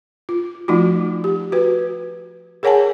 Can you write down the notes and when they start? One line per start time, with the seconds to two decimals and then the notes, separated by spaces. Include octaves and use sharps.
0.29 F4
0.68 F3 A3 D#4 F4 F#4
1.24 G4
1.52 F#4 B4
2.63 G#4 A#4 C#5 F#5 G#5 A5